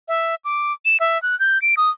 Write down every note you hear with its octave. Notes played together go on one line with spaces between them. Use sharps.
E5
D6
E7
E5
F#6
G6
D7
D#6